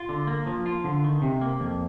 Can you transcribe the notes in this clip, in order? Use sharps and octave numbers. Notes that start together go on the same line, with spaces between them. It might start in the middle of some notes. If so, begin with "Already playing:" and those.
Already playing: F4
D3
A#3
F3
F4
D3
D#3
C3
A#3
F2